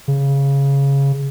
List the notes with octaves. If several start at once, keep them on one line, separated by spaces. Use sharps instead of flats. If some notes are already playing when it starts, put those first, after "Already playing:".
C#3